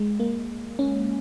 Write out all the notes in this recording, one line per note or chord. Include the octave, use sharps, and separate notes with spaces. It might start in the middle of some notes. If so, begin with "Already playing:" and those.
Already playing: G#3
A#3
C#4